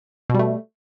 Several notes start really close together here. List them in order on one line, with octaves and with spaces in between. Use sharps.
B2 G3 A3